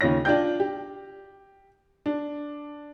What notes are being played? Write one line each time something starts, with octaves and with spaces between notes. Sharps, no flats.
D#2 C#3 F4 C#5 A#6
D4 F4 D5 G5 G6
G4
D4